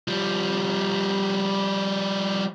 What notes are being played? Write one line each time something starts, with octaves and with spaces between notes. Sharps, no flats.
F3 G3